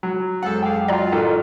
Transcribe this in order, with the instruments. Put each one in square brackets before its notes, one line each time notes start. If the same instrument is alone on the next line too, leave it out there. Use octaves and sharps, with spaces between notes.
[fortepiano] F#3
[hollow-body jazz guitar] F#2 G#3 F#5 [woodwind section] A4 C5
[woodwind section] G4 G#4 F5 [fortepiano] G5
[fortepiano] F#3 G5 [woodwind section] F4 [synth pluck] D5 D#5 A#5
[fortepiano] A1 D#3 A4